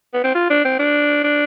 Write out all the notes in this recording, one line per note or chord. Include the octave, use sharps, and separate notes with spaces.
B3
C4
F4
D4
C4
D4
D4